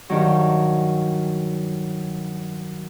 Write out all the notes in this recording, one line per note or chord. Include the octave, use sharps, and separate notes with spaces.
G2 D#3 F#3